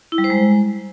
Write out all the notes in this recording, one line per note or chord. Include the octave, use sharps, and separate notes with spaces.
E4
G3
C5
G#3